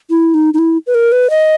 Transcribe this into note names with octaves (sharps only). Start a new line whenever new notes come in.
E4
D#4
D#4
E4
B4
A#4
B4
D#5